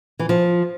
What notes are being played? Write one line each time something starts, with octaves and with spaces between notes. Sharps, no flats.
E3
F3